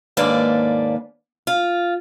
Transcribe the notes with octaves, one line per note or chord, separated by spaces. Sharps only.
D#2 G#2 A#3 D4 B4 D5
F4